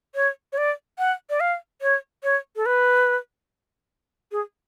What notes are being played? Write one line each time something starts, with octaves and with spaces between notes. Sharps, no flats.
C#5
C#5
D5
F#5
D5
F5
C#5
C#5
A4
B4
G#4